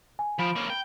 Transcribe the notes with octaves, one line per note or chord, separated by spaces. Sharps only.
G#5
F3 B5 D7
A#3 C#4
G5